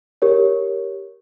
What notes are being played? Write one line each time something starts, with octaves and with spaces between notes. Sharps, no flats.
G4 A#4 C#5